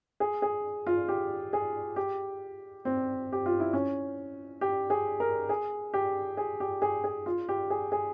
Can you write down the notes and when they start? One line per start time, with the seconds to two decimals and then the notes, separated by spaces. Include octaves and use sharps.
0.20 G#4
0.42 G#4
0.87 F4
1.08 G4
1.53 G#4
1.96 G4
2.85 C4
3.32 G4
3.46 F4
3.60 E4
3.73 C#4
4.61 G4
4.90 G#4
5.20 A#4
5.49 G#4
5.94 G4
6.37 G#4
6.60 G4
6.82 G#4
7.04 G#4
7.26 F4
7.49 G4
7.70 G#4
7.92 G#4